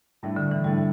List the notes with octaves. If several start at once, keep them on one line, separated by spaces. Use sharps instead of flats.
A2 G3 A3 D4
D3
E3
A2 G3 A3 D4